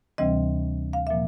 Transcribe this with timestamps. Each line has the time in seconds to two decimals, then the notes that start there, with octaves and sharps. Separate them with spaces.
0.18 D2 C3 E3 G3 C4 D#5
0.93 F5
1.07 A#2 F3 A#3 E5